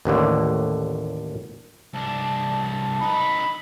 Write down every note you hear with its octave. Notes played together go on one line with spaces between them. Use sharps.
A1 D#2 A2 D3
C2 D4 A5
D#4 B4 B5